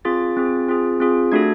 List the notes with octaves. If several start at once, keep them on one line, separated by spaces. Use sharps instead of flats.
C4 F4 G#4 A6
C4 F4 G#4
C4 F4 G#4
C4 F4 G#4
A3 D4 F#4 A4 G#6